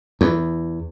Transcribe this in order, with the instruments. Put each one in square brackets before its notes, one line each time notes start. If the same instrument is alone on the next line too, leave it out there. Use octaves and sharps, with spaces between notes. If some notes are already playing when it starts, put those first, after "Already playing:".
[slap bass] E2